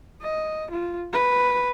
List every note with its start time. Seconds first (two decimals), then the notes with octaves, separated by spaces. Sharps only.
0.22 D#5
0.70 F4
1.13 B4